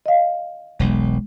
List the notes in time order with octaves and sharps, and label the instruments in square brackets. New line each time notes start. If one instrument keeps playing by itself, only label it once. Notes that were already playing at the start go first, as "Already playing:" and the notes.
[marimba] D#5 F5
[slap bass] E1 B1 [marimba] G#3